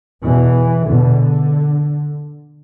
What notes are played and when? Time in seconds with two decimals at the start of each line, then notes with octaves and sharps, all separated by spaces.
0.24 E2 B2 E3
0.88 E2 B2 D3